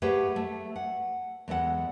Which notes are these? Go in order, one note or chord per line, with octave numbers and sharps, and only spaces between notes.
A3 G4 G#4 B4 C#5 F#5
A3
F#5
E2 G#3 A4 F#5